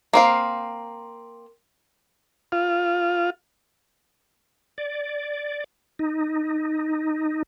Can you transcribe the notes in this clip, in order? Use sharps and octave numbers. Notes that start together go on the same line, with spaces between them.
A#3 C4 F5
F4
D5
D#4